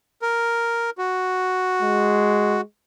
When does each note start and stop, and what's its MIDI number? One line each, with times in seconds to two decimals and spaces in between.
0.22 0.90 70
0.98 2.61 66
1.82 2.61 56